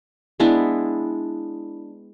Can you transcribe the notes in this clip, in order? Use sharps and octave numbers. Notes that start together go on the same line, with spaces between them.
G#3 B3 D4 E4